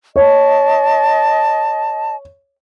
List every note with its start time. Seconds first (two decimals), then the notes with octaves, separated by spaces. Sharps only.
0.16 C#5 D#5 A5